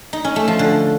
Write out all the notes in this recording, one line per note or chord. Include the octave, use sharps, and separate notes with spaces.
D#4
C#4
A3
F3
D3